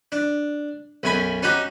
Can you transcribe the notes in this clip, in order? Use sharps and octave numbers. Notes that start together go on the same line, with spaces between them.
D4
B1 F#2 C#4 G#5 B5
C#4 D#4 F#4 G4